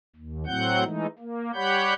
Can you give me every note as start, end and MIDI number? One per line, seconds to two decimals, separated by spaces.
0.16 0.45 39
0.46 0.84 45
0.46 0.84 54
0.46 0.84 60
0.46 0.84 78
0.46 0.84 91
0.84 1.06 52
0.84 1.06 56
0.84 1.06 57
0.84 1.06 63
1.19 1.51 58
1.54 1.94 55
1.54 1.94 67
1.54 1.94 73
1.54 1.94 78
1.54 1.94 83
1.54 1.94 91